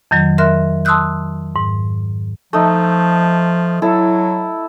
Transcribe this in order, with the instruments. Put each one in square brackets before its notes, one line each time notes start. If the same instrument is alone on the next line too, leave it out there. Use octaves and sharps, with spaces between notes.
[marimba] F2 D#3 F#3
A#4 E5 C6 F6 F#6
A5 C6 D#6 E6 F#6 G6
G#2
[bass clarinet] F3 [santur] A3 D#4
[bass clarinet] F#3 [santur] E4 A4